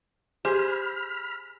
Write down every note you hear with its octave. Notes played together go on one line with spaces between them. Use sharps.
G4 G#4 C5 B5 F6